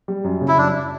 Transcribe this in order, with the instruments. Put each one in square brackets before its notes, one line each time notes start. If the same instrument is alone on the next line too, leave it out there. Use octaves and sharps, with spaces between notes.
[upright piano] G3
F#2
C#3
[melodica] E4
[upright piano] F#2 [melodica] D4